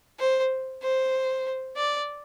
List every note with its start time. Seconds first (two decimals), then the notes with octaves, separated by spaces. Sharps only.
0.20 C5
0.83 C5
1.77 D5